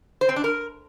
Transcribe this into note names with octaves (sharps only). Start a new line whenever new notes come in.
C5
C4
D4
A#4